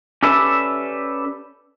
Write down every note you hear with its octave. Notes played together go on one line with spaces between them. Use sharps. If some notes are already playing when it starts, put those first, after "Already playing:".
C#4 G4 A4 B4 D5 E5